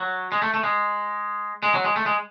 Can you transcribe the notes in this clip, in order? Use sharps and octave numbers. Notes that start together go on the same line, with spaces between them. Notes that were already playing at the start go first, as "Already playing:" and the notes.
Already playing: F#3
G#3
A3
A3
G#3
G#3
F#3
G#3
A3
G#3